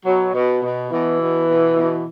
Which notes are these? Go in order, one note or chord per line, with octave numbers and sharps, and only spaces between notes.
B2 F#3
B2
B2
B2 E3
B2
B2
B2